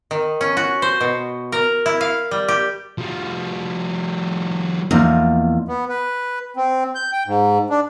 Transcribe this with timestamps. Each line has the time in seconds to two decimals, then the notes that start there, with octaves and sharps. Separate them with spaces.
0.11 D#3
0.41 C#4
0.57 F#4
0.82 C5
1.01 B2
1.52 A#4
1.86 E4
2.01 F5
2.31 G3
2.48 G4
2.98 F3 G3
4.91 E2 F3 A#3 D#4
5.68 B3
5.89 B4
6.57 C4
6.95 G6
7.12 G5
7.27 G#2
7.70 D4